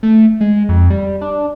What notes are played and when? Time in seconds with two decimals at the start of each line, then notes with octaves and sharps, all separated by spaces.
0.03 A3
0.41 G#3
0.69 F2
0.90 G3
1.21 D4